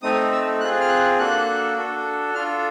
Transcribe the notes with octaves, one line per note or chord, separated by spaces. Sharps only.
A3 C4 D#4 D#6
E6
C4 F4 G#4 F#6
F6
F#6
A#3 D4 F#4 A4 F#6
D4 F#4 A4
D4 F4 A4 F6